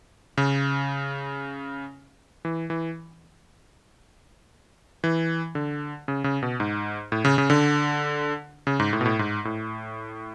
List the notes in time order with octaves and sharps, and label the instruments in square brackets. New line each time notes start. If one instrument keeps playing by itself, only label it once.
[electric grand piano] C#3
E3
E3
E3
D3
C#3
C#3
B2
G#2
A2
C#3
C#3
D3
C#3
G#2
A2
B2
A2
G#2
A2